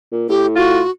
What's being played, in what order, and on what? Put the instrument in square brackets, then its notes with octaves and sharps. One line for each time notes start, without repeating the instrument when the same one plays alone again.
[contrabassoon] A#2
[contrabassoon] A2 [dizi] G4
[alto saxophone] F4 [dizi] F#4